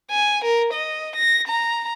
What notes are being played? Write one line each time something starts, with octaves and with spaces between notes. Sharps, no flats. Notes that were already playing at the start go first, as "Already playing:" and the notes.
G#5
A#4
D#5
A#6
A#5